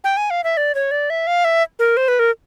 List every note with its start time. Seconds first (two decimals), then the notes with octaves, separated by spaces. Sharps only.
0.04 G5
0.17 G#5
0.30 F5
0.44 E5
0.57 D5
0.75 C#5
0.91 D5
1.10 E5
1.27 F5
1.45 E5
1.79 A#4
1.97 C5
2.08 B4
2.19 A#4